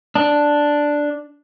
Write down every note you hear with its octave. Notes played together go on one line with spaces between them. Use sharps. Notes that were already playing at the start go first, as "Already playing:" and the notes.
D4